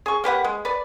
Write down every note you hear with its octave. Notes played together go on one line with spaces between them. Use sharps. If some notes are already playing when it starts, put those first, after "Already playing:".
G#4 C#6
A#3 G4 B4 F#5
G#3
B4 D5